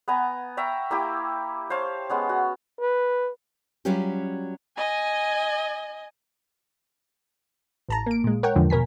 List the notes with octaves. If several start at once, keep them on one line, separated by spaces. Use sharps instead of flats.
B3 B4 G#5 A#5
E5 G5 A#5 C#6
A#3 E4 G4
C5 C#5 F5 A5
G#3 B3 C#4
F#4
B4
F#3 G3 C#4 F4 G4
D#5 G#5
A1 A5 A#5
A#3 D7
A#2 G#3
A#4 C#5 F#5 G5
E2 G#2 D3 F3
B2 A#4 G#5 B6